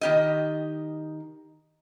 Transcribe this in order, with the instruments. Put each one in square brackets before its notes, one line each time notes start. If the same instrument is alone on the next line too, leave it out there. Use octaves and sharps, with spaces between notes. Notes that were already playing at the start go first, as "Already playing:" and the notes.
[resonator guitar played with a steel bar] D#3 G4 D#5